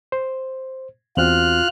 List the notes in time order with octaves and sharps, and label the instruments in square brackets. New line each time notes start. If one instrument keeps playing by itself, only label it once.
[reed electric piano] C5
[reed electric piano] E2 C4 F#4 [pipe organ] F4 F6 F#6